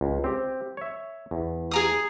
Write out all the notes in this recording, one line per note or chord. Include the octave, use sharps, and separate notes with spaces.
C#2
C4 G4
C#5 E5
E2
G#4 A#5 D#6